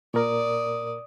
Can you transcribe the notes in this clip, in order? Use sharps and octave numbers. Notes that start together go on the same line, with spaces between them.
A#2 A#4 D5 D#6